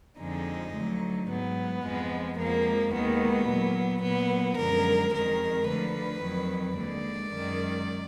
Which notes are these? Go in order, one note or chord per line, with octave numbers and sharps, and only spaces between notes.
F2 D3 F3 G#3 D#4
D2 D3 F#3
G#2 F#3 B3
F2 F3 G#3
F2 F3 G#3 A#3
D#2 D#3 G#3 B3
A#2 F#3
F#3 B3
A#2
F#2 D3 F3 G#3 A#4
F2 D#3 G#3 A#4
D2 D3 F3 B4
F2 D#3 F#3
D#2 D3 G#3 D5
F#2 D#3 G#3